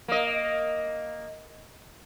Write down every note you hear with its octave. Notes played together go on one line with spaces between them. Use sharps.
A#3 D#5